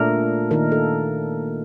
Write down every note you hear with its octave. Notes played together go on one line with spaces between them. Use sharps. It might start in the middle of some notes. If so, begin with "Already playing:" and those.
Already playing: A#2 A3 D4 A#4
D#3 A#3 D#4 A#4
A4